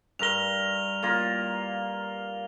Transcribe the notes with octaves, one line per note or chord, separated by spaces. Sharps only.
G2 A#4 F7 G7
A#3 F4 A#4